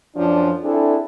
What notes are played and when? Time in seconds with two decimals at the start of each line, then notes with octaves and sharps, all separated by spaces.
0.16 F#2 F3 D4
0.62 C4 D4 E4 G#4 A4